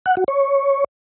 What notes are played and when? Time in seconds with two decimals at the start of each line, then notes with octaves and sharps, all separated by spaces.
0.06 F#5
0.17 F#4
0.28 C#5